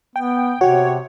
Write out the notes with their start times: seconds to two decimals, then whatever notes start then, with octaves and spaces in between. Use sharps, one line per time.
0.16 B3 G5
0.61 C3 F#4 C#5 F#5 G5